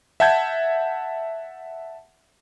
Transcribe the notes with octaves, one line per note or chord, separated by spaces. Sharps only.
E5 F#5 A5 G6 G#6